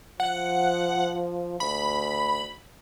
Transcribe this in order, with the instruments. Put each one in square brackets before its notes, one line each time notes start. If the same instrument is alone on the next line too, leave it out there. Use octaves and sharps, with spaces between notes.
[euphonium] F3 [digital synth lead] F#5
[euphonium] D2 [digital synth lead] B5